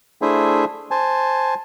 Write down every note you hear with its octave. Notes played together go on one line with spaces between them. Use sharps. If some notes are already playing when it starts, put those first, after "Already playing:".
A3 D4 E4 G#4 C5 E5
C5 G#5 A5